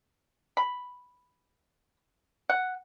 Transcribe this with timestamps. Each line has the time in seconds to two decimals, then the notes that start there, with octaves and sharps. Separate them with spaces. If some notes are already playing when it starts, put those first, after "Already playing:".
0.57 B5
2.50 F#5